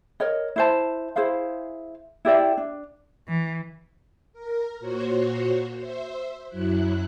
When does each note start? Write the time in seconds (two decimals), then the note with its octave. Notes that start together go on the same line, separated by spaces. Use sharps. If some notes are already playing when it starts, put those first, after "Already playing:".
0.20 A#4 C#5 D#5
0.56 E4 C5 A5
1.16 E4 G#4 C5 F5
2.25 E4 G4 D5 E5
2.57 D4
3.28 E3
4.33 A#4
4.80 A#2 F#4 C5 C#5
5.77 C5 E5
6.48 F#2 F#3 E4 F#6